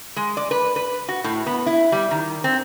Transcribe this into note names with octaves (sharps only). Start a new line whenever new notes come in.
G#3
D5
B4
B4
F#4
A2
B3
E4
G3
D#3
C4